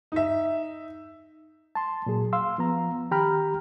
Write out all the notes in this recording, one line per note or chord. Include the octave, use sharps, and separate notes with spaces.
D#4 E5
A5 C6
A#2 F#3 G#4
F5 C6 E6
F3 B3 A#5
D#3 G4 G5 A#5 B5 F6